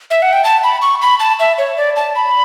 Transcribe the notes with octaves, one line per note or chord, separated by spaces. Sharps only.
E5
F#5
G5
A5
B5
C#6
B5
A5
E5
C#5
D5
A5
B5